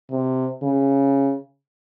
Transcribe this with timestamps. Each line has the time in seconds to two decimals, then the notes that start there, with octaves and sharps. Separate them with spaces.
0.11 C3
0.63 C#3